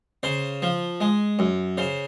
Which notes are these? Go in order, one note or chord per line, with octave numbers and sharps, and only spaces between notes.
C#3 C5
F3
G#3
F#2
C#3 C5